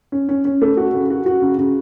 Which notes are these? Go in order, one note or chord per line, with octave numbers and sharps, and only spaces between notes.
C#4
C#4
C#4
A3
F#4
C#3
F#4
F#4
C#3
C#3